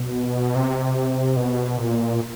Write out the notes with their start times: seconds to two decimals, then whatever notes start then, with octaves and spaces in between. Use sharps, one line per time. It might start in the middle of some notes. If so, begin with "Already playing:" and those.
Already playing: B2
0.55 C3
1.36 B2
1.77 A#2